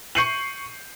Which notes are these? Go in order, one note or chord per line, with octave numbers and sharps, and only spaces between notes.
C#6 G6 C7 C#7 D#7 F#7